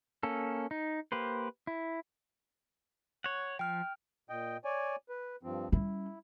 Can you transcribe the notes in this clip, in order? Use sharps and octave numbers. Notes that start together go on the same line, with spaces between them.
A#3 C#4 A4
D#4
A#3 G4 B4 C5
E4
C#5 F#5
F3 G5 F6
A#2 D#5 G5
C#5 D5 G#5
B4
G2 F3 C4
G3 C#4 E4